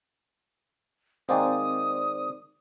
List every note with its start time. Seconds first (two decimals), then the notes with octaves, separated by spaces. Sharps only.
1.29 D#3 G#3 A#3 C4 C5 D5 D#6